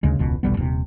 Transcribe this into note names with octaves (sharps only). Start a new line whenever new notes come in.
D2 C#3 G#3
E1 C#2 B2
D#1 B1 G3 B3
D#1 C3